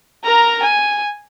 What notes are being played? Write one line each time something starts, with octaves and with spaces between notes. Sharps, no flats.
A#4 A#5
G#5